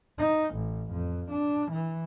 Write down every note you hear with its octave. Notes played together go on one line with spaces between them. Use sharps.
D#4
A1
F2
D4
E3